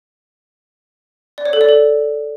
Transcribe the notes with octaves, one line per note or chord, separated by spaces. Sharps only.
D5
C#5
A4
D5
A4